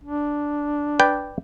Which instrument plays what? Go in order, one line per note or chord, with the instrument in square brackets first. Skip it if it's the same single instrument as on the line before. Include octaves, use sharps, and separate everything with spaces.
[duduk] D4
[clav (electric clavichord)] B4 D5 G5